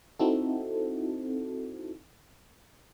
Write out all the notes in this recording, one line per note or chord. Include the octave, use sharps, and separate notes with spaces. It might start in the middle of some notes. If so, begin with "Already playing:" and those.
C4 D#4 E4 F#4 A4